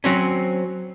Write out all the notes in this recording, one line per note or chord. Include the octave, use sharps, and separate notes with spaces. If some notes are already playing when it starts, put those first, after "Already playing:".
F#3 C4 C#4